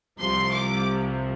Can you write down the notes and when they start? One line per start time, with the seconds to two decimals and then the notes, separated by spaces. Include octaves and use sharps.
0.19 C2 C3 F3 C6
0.52 D6